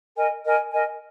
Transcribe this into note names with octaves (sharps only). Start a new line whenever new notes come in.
A#4 D#5 G#5
A#4 D#5 G#5
A#4 D#5 G#5